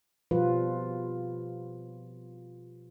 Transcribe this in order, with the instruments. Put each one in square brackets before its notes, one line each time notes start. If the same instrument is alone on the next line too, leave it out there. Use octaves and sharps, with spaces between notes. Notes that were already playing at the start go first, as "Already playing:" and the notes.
[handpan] B2 F3 G3 F4 B4